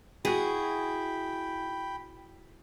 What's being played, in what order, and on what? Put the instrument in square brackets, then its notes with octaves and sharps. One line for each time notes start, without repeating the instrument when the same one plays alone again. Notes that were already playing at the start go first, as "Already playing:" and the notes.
[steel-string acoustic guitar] E4 [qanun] F#4 G#4 [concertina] G5 B5